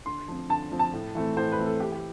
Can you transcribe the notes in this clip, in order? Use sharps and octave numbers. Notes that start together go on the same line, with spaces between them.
D3 C6
F3 C4
D3 A5
F3 C4
A5
A2
E3 A3 C4
A2 C5
B4
E3 A3 C4
A4
E3 G4
G4